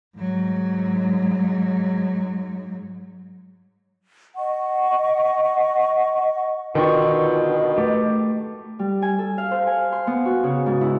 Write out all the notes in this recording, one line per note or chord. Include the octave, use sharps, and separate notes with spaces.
G#2 F#3
D#5 F#5 C#6
B2 D3 D#3 F4 G5 C#6
A3 G4
G3
G#5
A4
F5
C5
G#5
C6
B3
F#4
C#3
G#2
E4